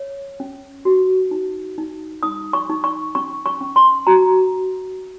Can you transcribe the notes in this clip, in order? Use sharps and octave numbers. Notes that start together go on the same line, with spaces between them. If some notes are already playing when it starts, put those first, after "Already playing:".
Already playing: C#5
C#4
F#4
D#4
D#4
D#4 D#6
C#6
D#4
C#6
C#4 C#6
C#6
C#4
C6
F#4 A#5